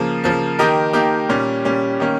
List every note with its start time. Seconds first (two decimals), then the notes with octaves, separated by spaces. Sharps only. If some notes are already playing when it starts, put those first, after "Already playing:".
Already playing: C#3 F3 A#3
0.24 C#3 F3 A#3
0.59 D#3 A#3 D#4 G4 A#4
0.93 D#3 A#3 D#4 G4 A#4
1.29 A#2 G3 C#4
1.65 A#2 G3 C#4
2.00 D#3 A#3 C#4